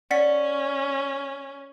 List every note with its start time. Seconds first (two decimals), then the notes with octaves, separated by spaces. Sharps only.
0.11 C#4 D5 F#5 B6